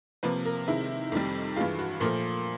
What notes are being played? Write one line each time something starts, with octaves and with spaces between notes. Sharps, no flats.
C3 F3 A#3 B4
A#4
C3 D#3 G#3 E4
F2 C3 D#3 G3
G2 E3 G#3 F4
F#4
A#2 F3 A3 A#4